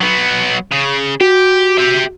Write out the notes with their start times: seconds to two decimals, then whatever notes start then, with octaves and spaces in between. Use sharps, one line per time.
0.01 F#3 B3
0.72 C#3
1.21 F#4 G4
1.78 G4 E5